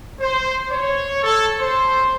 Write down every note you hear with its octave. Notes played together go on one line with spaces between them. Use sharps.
C5
C#5
A4
C5